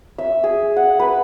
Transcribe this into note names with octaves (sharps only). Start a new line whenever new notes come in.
E5
G#4
F#5
B4